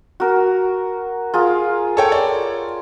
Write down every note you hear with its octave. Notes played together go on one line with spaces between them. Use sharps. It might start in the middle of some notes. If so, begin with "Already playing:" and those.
F#4 A#4
F4 G#4 A#4
A4 C#5 G5
D5